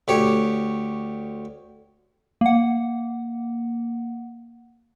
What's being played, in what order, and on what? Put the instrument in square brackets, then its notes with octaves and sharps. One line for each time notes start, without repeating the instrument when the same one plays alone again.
[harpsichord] D2 G4 C#5
[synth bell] A#3 F#5